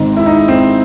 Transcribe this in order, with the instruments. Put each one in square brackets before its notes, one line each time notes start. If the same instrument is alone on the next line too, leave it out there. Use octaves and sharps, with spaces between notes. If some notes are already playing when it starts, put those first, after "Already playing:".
Already playing: [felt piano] G#1 G#2 [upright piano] C4
[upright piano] E4
D#4
C4